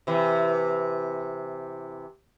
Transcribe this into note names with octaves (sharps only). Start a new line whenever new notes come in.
C3 E3